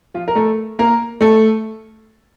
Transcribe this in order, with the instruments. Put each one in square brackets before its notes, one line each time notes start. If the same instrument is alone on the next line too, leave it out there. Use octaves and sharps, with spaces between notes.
[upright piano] F3 F4
A#4
A3 A4
A#3 A#4
A3 A4